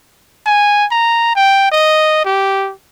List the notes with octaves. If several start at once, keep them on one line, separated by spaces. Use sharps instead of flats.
G#5
A#5
G5
D#5
G4